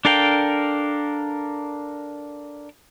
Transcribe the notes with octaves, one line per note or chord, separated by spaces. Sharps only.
D4 A4 A#4 F5 G5